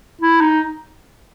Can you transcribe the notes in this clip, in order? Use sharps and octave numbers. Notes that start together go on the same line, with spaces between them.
E4
D#4